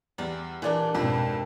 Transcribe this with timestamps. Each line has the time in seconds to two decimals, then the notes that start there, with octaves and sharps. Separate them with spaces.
0.18 E2 G3 D5
0.62 A#2 E3 A#3 D4 D5
0.94 F2 G#2 B2 D4 E4